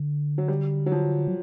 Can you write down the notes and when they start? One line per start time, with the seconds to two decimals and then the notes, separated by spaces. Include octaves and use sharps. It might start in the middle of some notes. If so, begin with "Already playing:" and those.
Already playing: D3
0.38 F#3
0.48 G3
0.86 F#3
0.92 F3
1.27 F#3